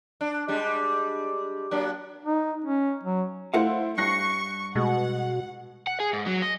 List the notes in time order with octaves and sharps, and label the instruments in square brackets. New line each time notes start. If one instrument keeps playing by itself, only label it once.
[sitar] D4
G3 G#3 D4
F#3 A#3 D4
[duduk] D#4
C#4
F#3
[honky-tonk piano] A3 E4 C5 [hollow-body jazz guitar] F5 F#5
[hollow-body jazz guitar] G2 [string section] C#6 [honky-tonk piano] F#6 A#6 C7
[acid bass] B2 [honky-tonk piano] G#3 [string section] F#5
[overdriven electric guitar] F#5
G#4
G#2
F#3
D#5